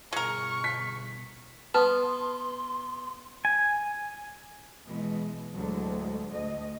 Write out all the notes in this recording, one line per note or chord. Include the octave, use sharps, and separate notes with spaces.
G1 B2 G#3 A#4 C#6
B6
B3 B4 A5 C6 D#6
G#5
B2 E3 G#3
D2 A2 D3 F#3 G#3
D2 D#5